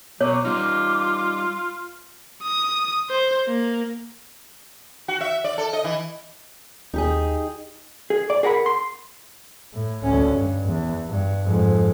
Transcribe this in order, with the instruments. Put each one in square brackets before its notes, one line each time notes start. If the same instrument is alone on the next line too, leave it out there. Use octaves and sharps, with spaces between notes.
[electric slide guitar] B2 B3 [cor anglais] F#3 [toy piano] C#5 [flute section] D6
[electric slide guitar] G3 D#4 [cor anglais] F4
[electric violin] D#6
C5
A#3
[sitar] F#4
E5
D5
A4
D#5
E3
[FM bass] D#2 [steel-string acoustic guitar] D#4 G4 G#4
[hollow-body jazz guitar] G#4
D5
G#4 A#4 F#5 B5
C6
[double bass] A2
D2 C#4
G2
E2
G2
F2 G#2